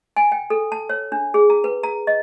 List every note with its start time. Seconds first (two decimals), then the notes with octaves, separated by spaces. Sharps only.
0.17 G#5
0.32 G5
0.50 A4
0.72 A5
0.89 C#5
1.12 D4
1.34 G#4
1.50 A#5
1.64 B4
1.83 A#5
2.07 D#5